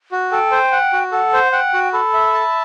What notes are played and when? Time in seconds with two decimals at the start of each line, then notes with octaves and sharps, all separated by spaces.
0.12 F#4
0.31 A4 G5
0.51 C5
0.72 F#5
0.93 F#4
1.12 A4 F#5
1.33 C5
1.52 F#5 G5
1.74 F#4
1.93 A4 B5
2.14 E5
2.34 A5